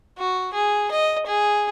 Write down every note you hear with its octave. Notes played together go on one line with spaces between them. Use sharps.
F#4
G#4
D#5
G#4